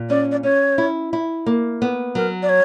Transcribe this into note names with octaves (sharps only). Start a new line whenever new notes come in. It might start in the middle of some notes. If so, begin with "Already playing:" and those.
Already playing: A#2
C#4 D5
D5
C#4 C#5
E4
E4
A#3
B3
F#3 A#4
D5
C#5